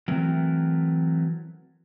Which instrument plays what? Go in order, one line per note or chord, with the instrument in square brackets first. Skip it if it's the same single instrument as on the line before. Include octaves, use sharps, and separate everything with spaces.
[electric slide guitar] E3 F#3 A3 C4 A#4